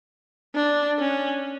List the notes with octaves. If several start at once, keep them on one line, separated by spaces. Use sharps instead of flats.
D4
C#4